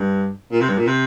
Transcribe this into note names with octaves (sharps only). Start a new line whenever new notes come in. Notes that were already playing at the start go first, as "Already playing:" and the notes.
Already playing: G2
A#2
C3
G2
A#2
C3